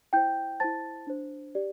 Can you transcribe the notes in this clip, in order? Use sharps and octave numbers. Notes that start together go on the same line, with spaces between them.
E4 C5 G5 G6
E4 C5 A5 A6
D4 C5
G4 D5